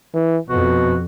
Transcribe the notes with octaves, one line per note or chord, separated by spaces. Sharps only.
E3
F2 B2 F#4